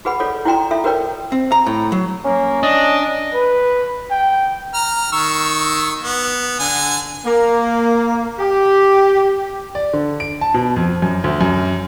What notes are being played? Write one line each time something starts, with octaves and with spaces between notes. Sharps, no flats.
F#4 G#4 B4 F#5 B5
F4 A4 C#5 D5
E4 F#4 D5 G5 A#5 C6
F4 A4 E5
F#4 A#4 B4 C#5 D5 G5
C4
A#5
A2
F#3
A#3 C#4
D4 D#5
B4
G5
A#5 F6
D#3 C#6 E6
B3
D3 G#5
A#3
G4
D5
D3
D7
A5
B2
F2
F#2
D2
F#2